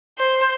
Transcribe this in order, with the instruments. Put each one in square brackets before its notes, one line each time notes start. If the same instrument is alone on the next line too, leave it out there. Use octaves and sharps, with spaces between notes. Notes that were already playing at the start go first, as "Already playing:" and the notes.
[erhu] C5